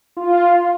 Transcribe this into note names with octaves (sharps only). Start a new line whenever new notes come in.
F4